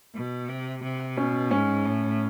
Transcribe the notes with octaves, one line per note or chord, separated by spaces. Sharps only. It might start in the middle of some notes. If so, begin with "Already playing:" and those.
B2
C3
C3
B2 C#4
G#2 C#4
A2